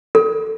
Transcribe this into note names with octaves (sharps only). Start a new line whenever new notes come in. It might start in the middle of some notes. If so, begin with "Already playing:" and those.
A4